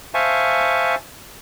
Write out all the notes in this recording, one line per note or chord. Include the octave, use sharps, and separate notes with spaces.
C5 E5 F5 G#5 A5 C#6